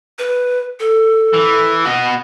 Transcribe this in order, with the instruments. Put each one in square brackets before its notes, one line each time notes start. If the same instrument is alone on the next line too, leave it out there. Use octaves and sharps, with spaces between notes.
[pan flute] B4
A4
[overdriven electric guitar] E3
F#4 D#5